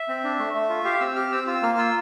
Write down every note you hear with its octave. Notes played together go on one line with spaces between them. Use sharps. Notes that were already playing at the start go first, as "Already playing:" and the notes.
Already playing: E5
C4
D4
A3
A3
F4
G4 F5
C4 E6
G4 F6
C4 E6
F4 E6
A#3 F6
F4 E6